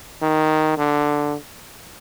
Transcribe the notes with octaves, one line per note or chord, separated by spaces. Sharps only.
D#3
D3